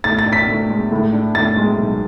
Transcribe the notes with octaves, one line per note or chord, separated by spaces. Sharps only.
A2 A6
A6
D4
B6
A2
G#3
A2
D4
A2 A6
G#3
B1